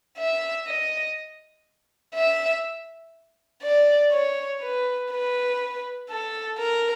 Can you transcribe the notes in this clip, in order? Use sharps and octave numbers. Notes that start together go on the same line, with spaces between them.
E5
D#5
E5
D5
C#5
B4
B4
A4
A#4